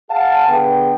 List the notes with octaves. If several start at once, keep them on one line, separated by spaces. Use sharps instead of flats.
G#4 F5 F#5 G#5 A5
D3 B3 G#4 G5